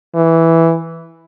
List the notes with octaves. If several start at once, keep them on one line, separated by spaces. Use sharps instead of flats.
E3